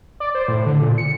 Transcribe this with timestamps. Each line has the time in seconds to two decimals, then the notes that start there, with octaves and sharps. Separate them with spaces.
0.20 D5
0.35 C5
0.48 A2
0.66 D3
0.82 A#2
0.98 C#7